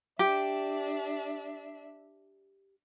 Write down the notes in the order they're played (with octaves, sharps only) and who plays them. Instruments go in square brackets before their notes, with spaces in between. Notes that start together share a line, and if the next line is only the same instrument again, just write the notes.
[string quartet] D4 E5 [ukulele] G4